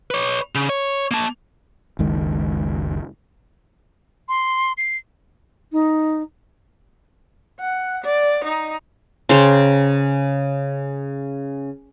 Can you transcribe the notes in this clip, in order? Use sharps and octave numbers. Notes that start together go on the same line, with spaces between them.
B4 C#5
C#3
C#5
A#3 A5
F#1 C#2 D#3 G#3
C6
C7
D#4
F#5
D5
D#4
C#3 C5 G5 A#5